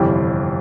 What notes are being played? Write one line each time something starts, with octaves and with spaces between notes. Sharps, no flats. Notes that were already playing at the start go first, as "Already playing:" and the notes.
Already playing: G1 F2 C3 E3 G3